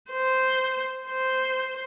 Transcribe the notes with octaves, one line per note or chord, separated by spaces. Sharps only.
C5
C5